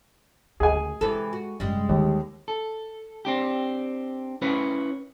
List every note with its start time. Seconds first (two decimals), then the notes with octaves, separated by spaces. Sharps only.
0.60 D2 C#3 G#4 G#5
1.01 C3 E3 G#3 A4
1.33 F#4
1.60 F#2 C3 G3 G#3
1.89 D#2 D3
2.48 A4
3.25 C4 D4 G4
4.42 C#4 E4 A#4 B4 C#5